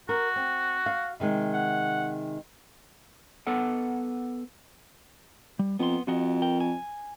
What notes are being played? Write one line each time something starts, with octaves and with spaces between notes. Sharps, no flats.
F#4 A#4
C4
F5
C3 D#3 G#3
F#5
B3 A4 B4 F#5
G3
F2 B3 C6
F2 F4 F#4 D#5
A#4 G5
G#5